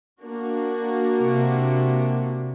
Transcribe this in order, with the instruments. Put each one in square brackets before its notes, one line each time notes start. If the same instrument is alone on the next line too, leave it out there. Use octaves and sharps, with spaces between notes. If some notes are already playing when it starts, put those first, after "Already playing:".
[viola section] A#3 D4 F#4
[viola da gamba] C3